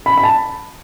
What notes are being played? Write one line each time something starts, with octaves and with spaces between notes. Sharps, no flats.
B5
B5
A5